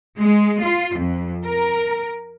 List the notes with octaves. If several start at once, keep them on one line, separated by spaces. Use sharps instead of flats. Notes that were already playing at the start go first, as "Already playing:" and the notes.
G#3
F4
F2
A#4